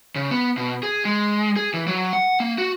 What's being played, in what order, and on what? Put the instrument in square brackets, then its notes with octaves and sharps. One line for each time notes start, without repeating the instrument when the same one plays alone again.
[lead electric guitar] C#3
B3
B2
G#4
G#3
G#4
E3
F#3
F#5
A#3
F#4